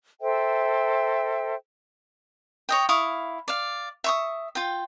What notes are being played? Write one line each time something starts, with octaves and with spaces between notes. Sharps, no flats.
A4 C5 E5 G5
C#5 D#5 G5
E4 F5 C#6 D#6
D5 F5
E5 C#6 D#6
F4 G5